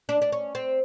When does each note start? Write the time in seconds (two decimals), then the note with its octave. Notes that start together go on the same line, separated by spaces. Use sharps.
0.09 D4
0.22 D4
0.32 C#4
0.55 C4